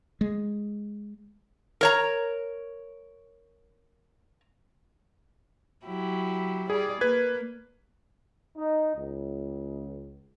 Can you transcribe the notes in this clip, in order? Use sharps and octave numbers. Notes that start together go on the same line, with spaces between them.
G#3
A#4 C#5 A#5
F#3 E4 G4
G3 G#4 D5
A#3 B4 G#6
D#4
C#2